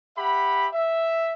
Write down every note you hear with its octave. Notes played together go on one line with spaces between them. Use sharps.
G4 E5 F#5 B5
E5